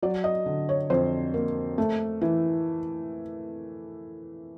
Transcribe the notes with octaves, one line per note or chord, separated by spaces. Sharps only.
F#3 D5
D#5
D3
C#5
F2 C5
A#3
A3
E3